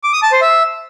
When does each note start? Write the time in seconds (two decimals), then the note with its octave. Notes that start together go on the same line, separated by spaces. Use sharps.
0.03 D6
0.13 D#6
0.22 A5
0.32 C5
0.41 E5